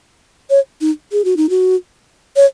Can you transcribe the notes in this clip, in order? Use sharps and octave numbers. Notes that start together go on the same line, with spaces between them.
C#5
D#4
G#4
F#4
D#4
F#4
C#5